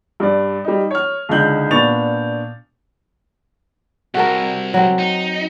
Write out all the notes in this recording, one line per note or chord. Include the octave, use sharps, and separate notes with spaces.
G2 D5
G3 D#4
C#5 F6
C#2 D3 D#4 G6 F#7
A#2 B3 D4 C#6 A6 F7
C2 F#4 A4 A#4
F#3 C4
D#4